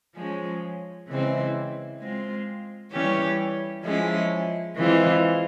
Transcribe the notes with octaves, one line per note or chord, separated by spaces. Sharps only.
F3 G#3 C#4
C#3 E3 G#3 C4 E4
G#3 C4 F4
E3 G3 C#4 G4 C#5
F3 G#3 C#4 E4
E3 G#3 C4 F4